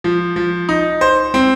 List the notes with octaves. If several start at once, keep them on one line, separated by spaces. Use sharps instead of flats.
F3
F3
D#4
C5
C4